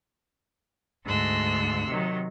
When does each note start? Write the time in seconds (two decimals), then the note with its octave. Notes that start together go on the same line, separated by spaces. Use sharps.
1.04 D2 G#2 D3 C6 E6 F#6
1.87 C3 D#3 F#3